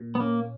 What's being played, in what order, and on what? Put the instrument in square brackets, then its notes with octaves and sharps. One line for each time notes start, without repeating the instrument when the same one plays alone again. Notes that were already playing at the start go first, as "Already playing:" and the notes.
Already playing: [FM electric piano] A#2
[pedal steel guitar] B3
[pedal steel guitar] A#3 [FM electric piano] C#4